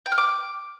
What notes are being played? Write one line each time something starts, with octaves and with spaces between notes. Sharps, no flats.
G5
F6
D6